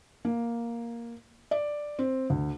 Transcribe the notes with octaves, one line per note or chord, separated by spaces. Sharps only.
A#3
D5
C4
D2